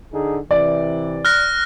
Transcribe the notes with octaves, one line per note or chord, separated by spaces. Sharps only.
D3 D#4 G#4
C3 E3 D5
F6 F#6 A#6